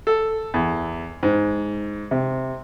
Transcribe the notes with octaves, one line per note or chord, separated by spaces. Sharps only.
A4
E2
G#2
C3